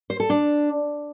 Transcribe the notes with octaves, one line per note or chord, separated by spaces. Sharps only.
C5
A4
D4